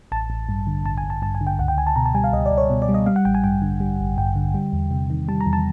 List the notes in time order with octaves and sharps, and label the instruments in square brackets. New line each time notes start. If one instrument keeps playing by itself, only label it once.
[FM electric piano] A1 A5
A1
G2
D3
A1 A5
G#5
A1
A5
G2 A5
G#5
D3
G5
C#2 F#5
G5
C#2 G#5
A5
B2 A#5
A5
G3 G#5
F5
C#2 D#5
D5
C#2
C#5
B2
D5
G3
D#5
G3 F5
F#5
A1 G5
G#5
G2 G5
D3
G3
A1
G2 G5
D3
G3
E2
C3
D#3
G3 A5
A#5
E2
A5